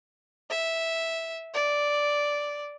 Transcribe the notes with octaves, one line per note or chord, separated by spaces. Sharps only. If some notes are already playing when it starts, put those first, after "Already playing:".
E5
D5